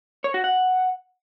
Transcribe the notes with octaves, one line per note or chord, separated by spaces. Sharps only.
C#5
F#4
F#5